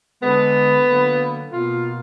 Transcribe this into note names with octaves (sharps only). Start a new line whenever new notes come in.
D3 G#3 B3
D3 F#3 A#3
B2 A#3 F4